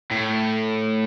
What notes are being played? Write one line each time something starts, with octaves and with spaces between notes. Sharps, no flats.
A2